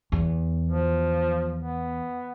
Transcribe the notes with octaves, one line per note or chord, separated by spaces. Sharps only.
E2
F3
B3